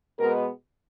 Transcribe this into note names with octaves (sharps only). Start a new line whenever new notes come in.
B2 G#3 B3 A#4